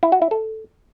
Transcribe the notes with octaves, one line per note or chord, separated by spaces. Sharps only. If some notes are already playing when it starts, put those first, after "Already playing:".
E4
F#4
E4
A4